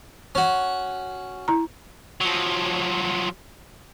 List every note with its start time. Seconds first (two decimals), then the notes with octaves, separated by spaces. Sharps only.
0.35 C#4 F#4
1.48 E4 A#5
2.20 F3 F#3